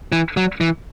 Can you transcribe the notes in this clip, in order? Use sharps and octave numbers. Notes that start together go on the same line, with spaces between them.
E3
F#3
E3